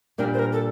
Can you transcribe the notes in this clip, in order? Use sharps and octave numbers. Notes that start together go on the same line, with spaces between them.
A#2 G3 D4 A#4
C5
A#4
A4